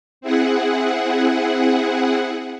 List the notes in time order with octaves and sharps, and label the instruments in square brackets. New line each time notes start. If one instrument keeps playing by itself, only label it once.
[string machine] C4 E4 G#4 F#5